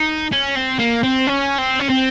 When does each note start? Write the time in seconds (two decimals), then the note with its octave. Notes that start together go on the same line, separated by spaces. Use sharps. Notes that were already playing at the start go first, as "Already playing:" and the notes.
Already playing: D#4
0.32 C#4
0.55 C4
0.79 A#3
1.03 C4
1.27 C#4
1.58 C4
1.80 C#4
1.90 C4